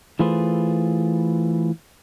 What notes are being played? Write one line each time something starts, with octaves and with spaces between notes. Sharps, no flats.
E3 A3 F4 G#4 B4 C5